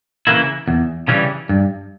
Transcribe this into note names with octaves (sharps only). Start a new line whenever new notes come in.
C#3 E3 A#3 E4
E2
C#3 E3 G3 C#4
G2